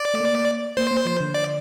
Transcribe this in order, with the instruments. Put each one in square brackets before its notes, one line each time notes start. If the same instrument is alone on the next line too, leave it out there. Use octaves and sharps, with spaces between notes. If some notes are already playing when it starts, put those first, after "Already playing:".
Already playing: [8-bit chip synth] D5
[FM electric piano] A3
A#3
[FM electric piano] A#3 [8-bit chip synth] C5
[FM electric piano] A#3
F3
D3
[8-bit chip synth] D5